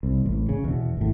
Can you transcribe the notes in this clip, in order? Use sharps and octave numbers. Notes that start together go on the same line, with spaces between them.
C2
A1
C#3
E2 B2
G#1 A2